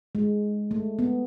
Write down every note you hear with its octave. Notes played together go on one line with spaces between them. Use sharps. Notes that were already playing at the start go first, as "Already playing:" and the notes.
G#3
A3
B3